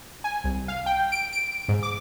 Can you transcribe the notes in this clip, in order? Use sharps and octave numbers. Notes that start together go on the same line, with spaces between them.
G#5
C2
F5
G5
D7
D7
G#2
D6